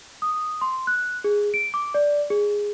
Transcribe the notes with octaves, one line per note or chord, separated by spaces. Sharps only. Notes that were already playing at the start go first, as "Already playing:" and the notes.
D#6
C6
F#6
G#4
D7
D6
D5
G#4